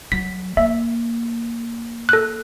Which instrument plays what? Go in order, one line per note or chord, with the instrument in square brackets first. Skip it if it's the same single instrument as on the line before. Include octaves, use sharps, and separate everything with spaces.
[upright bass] F#3 [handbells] B6
[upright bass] A#3 [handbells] E5
[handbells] A4 F#6